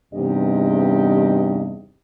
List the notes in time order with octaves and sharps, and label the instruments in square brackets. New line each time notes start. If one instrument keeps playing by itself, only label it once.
[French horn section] E2 G2 C3 D#4 G4 D#5